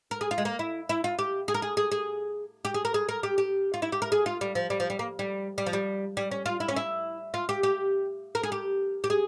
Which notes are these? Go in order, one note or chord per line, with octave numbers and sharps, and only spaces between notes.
A#4
G#4
F4
G#3
A#3
E4
E4
F4
G4
G#4
A#4
G#4
G#4
G#4
G4
G#4
A#4
G#4
A#4
G4
G4
F4
E4
G4
A#4
G#4
F4
G3
F3
G3
F3
G3
A#3
G3
G3
F3
G3
G3
C#4
F4
E4
C#4
E4
F4
G4
G4
A#4
G#4
G4
G4
G#4